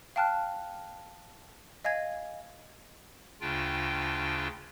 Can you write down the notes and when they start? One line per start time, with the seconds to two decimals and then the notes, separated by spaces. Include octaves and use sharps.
0.16 F5 G5 A5 F6 F#6
1.84 D#5 F5 G#5 G#6
3.41 D2 C#3 D4 F4 G5